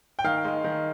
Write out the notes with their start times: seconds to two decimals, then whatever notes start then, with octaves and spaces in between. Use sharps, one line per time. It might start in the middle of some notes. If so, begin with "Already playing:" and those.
0.19 G5
0.24 D#3 F5
0.44 G#3
0.64 D#3